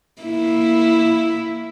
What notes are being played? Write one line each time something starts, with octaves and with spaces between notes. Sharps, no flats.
A#3 E4